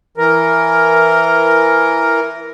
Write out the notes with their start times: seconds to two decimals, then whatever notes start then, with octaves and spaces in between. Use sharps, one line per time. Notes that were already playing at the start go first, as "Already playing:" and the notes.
0.17 E3 A#4